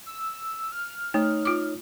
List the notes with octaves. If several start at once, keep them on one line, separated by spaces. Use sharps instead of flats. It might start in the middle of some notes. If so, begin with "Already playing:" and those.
E6
F6
A3 D#4 C#5 D#6
F4 D6